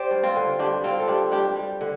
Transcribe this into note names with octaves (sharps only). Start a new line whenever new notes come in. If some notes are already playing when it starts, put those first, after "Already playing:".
Already playing: G4 C5 D5
G2
C4 F4
D3
G2 D4 G4
G2 C4 F4
A4
G2 D4 G4
G2 D4 G4
G3
D3